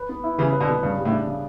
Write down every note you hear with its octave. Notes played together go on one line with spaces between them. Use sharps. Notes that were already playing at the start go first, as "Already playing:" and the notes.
Already playing: B4
B3
E4
C#3 E3 G3
B4
B2 D3
B3
G2 C#3
G3
A2
D4
C#3